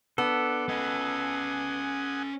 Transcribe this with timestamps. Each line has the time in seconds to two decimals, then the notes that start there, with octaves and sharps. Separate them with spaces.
0.18 B3 D4 A4
0.69 C#4 D#5 F#5 G#5 D#6